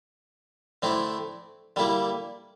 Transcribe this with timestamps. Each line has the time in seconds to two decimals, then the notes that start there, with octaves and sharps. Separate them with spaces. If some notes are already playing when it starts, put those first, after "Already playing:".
0.82 D3 A3 C4 E4
1.76 D3 G3 A#3 E4